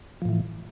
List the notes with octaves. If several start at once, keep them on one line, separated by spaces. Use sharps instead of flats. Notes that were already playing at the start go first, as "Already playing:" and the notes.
A2 E3 F3